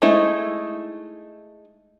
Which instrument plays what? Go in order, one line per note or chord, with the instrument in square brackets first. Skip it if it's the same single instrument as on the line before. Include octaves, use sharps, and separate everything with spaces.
[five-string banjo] G#3 A3 D#4 E4